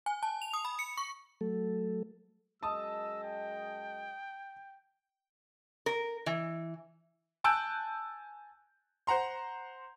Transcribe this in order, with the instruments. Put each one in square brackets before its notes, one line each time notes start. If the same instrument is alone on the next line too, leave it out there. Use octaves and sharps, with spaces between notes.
[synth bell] G#5
A5
F7
D#6
B5
C#7
C#6
[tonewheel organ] F#3 A3 A4
[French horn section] F#2 G#3 D#5 [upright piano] A5 D#6 [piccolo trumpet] E6
[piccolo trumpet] G5
[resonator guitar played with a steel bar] A#4
E3
[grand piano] G#5 A5 E6 F#6 G6 D7
C5 F#5 A#5 C6